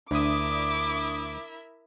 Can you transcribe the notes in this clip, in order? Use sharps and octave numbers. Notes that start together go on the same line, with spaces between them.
D2 D4 E4 A#4 E5 D6 D#6